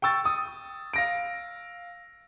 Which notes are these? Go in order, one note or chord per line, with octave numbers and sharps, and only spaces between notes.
G5 C#6 E6 A6
D#6
F5 A#6 D7